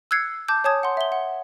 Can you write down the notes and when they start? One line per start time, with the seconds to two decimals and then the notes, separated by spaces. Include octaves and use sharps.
0.11 E6 F#6 G#6 C7 C#7
0.48 A5 D6 G6
0.64 C#5 G#5 A5 D#6 G#6
0.83 F#5 C6
0.97 E5 G7
1.12 F#5